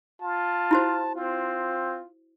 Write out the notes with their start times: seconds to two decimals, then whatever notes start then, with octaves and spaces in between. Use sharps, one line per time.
0.22 F4 A5
0.71 E4 F#4 C5
1.16 C4 F4